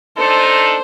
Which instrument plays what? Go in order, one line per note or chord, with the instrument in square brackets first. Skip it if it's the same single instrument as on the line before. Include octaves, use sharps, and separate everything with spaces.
[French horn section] D4 D#4 A4 [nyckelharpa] C5